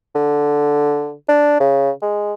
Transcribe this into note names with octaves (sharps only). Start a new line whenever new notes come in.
D3
D4
C#3
G#3